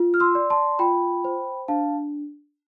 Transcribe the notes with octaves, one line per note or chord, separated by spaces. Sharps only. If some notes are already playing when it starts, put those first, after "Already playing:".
Already playing: F4
F6
C6 E6
D5
A5 C6
F4 G5 B5
C5
D4 F5 A5